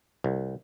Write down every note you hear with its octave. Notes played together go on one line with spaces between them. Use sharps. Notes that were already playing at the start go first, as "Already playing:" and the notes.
C2